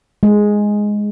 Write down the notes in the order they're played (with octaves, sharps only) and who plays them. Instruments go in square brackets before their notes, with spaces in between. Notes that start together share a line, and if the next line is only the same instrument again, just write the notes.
[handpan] G#3